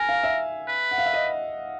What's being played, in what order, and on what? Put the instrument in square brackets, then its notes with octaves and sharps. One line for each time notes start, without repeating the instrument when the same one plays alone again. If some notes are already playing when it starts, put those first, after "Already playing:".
Already playing: [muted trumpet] A#4 [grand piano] G#5
[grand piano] F5
E5
[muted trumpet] B4
[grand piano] F#5
F5
E5
D#5